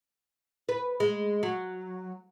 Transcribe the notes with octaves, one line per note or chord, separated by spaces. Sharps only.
B4
G#3
F#3